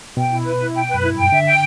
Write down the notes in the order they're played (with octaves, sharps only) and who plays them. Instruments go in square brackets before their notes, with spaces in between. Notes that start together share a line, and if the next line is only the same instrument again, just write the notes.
[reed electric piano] B2 [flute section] G5
[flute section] E4
B4
E4
G5
B4
[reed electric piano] F#2
[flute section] E4
[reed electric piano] G2
[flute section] G5
[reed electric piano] D3 [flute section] E5
[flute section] G5